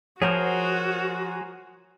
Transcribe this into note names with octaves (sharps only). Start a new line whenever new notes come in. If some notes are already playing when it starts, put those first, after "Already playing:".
F3 F#4 G#4 A#4 C5 C#5 F#5